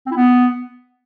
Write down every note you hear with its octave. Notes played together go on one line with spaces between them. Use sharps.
C4
E4
B3